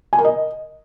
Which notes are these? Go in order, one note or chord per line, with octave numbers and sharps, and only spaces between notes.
G#5
A#4
D#5